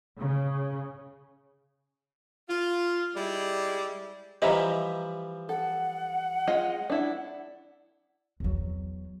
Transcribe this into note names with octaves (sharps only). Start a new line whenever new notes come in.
C#3
F4
G3 G#3 E4 D5
E3 F3 G3 D#5 E5 A#5
A4 F#5
G#3 F4 D#5
D4 E4
E2 F#3